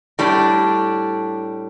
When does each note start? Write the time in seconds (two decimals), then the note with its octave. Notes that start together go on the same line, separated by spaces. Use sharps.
0.19 A2 G3 D4